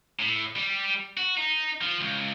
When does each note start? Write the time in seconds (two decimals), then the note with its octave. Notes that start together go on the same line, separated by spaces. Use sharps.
0.19 A2
0.56 G3
1.17 F#4
1.37 D#4
1.81 F3
2.01 C#2